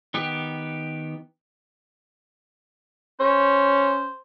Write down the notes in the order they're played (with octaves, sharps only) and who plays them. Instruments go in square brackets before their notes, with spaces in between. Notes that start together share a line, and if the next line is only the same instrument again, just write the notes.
[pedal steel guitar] D#3 B3 G4
[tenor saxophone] C#4 [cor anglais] C5